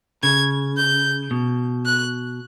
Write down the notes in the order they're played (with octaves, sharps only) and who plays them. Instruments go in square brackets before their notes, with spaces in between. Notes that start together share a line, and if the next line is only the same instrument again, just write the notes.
[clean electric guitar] C#3 [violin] G#6
[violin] G6
[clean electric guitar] B2
[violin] F#6